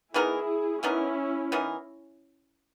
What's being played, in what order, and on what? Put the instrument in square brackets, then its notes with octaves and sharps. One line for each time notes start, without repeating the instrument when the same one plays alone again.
[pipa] E3 B3 D#4 A#4 [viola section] E4 G#4
[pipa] E3 B3 D#4 A#4 [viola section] C#4 E4
[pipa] E3 B3 D#4 A#4